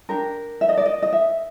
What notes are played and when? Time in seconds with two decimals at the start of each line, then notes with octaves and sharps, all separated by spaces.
0.09 D4 G4 A#4
0.61 E5
0.69 D#5
0.77 D5
0.86 D#5
1.02 D#5
1.13 E5